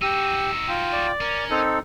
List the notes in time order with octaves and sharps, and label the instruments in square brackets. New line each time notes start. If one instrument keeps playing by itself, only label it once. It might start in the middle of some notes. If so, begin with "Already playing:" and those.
[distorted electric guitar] D#4 F#4 [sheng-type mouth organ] G4 [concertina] E6
[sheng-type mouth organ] F4 G5
[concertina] D5
[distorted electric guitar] C#4 [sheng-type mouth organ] A#4
[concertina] C4 D#4 A4